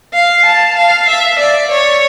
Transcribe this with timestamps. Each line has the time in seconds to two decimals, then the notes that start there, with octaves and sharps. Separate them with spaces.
0.14 F5
0.45 A5
0.76 F5
1.08 E5
1.39 D5
1.71 C#5